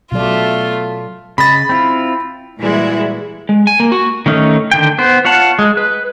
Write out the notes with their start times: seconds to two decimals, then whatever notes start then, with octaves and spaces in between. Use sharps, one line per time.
0.12 B2 F#3 A3 F4 D5
1.38 C#3 D#5 B5 A6
1.69 C4 E4 F4
2.59 A#2 E3 G3 G#3 E4 F#4
3.49 G#3
3.67 G#5
3.80 A#3
3.92 F#4
4.26 D#3 A3 C#4 D#4
4.71 D3 D#3 G5
4.99 B3 C5
5.25 F4 C#5 F5 F#5 A5
5.59 G#3
5.77 B4